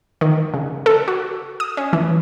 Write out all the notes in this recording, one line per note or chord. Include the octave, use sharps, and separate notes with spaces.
D#3
C#3
A4
F#4
D#6
C#4
E3